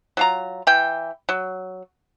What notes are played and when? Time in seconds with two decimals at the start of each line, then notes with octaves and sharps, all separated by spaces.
0.17 F#3 F4 A#5
0.67 E3 G5
1.29 F#3